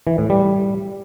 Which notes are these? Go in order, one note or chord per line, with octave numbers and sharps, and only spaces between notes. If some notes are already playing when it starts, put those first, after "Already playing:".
E3
A2
G3